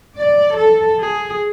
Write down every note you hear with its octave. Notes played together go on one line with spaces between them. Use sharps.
D5
A4
G#4